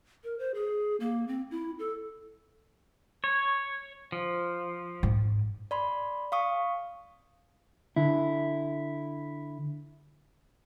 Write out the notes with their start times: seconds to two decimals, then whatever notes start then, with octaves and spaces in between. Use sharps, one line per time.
0.24 A#4
0.39 C5
0.54 G#4
1.00 A#3
1.28 C4
1.51 E4
1.79 A4
3.24 C#5
4.12 F3
5.03 G#2
5.71 D5 B5 C6
6.32 F5 C#6 D#6
7.96 D3 E4